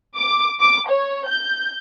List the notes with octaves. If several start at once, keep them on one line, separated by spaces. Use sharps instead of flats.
D6
D6
C#5
G6